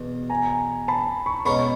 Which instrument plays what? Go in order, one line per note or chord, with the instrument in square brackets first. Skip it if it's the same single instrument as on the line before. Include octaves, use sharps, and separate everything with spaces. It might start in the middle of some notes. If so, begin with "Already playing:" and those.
Already playing: [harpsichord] E2 B2
[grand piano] G#5 A#5
A5 B5
B5 C#6
[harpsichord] B2 G#3 C#4 F#4 [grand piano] B5 C#6